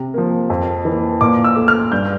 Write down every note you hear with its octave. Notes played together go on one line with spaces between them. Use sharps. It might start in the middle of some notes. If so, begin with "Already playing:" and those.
Already playing: C3
F3 A#3
F2
E3 A#3
A#2 D6
E6
A3
F6
G2 G6